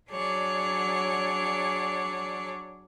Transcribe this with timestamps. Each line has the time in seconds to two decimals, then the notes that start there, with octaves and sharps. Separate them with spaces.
0.11 F#3 D4 G#4 C#5 D5